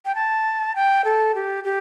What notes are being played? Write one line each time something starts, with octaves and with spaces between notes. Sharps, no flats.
G5
A5
G5
A4
G4
G4